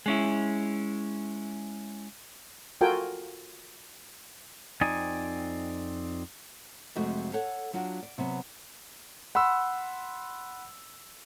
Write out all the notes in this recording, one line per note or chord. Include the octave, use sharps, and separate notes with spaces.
G#3 C#4 E4
F4 F#4 A4 A#4 G5 G#5
F2 C4 D#4 D5 D#5 G#5
F2 C3 G#3 A3 F#4
A4 C#5 F#5
F#3 D4 F4 F#4
D5
C3 F#3 B3
F#5 B5 C6 E6